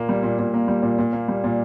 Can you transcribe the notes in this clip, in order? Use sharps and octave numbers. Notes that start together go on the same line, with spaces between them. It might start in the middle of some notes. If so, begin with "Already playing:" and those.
Already playing: A#2 A#3
G3
A#2
A#2
A#3
G3
A#2
A#2
A#3
G3
A#2